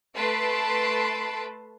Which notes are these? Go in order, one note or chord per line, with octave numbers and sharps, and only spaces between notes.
A3 B4 A5 C6 D7